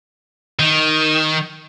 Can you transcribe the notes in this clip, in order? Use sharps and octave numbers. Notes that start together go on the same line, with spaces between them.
D#3